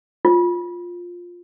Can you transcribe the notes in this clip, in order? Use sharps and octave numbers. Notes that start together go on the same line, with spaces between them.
F4